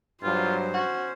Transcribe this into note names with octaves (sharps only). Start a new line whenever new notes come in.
G2 F#3 F4 C5
C#4 F#4